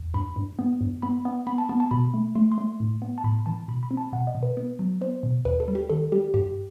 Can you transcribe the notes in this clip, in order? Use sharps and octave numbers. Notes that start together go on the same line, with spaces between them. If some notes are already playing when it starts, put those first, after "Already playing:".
Already playing: E2
G2 B5
G2
B3
G2
B3 B5
B3
B3 B5
A5
B3 A5
A5
B2 B5
A3
A3 C6
C6
A3
A2
B3
A5
A2 B5
E3 A5
B2 B5
B5
C4
A5
B2 F#5
D#5
B2
B4
B3
F#3
B3 C5
B2
D#2 B4
A4
G3
G4
D#3 A4
G3 G4
G2 G4